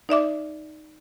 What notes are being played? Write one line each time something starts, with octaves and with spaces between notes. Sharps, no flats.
D#4 D5 E5 D6